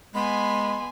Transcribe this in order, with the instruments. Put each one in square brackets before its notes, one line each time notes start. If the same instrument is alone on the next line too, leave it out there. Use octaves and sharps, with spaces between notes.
[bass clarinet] G#3 [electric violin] B3 G#5 [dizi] B5 [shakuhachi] C6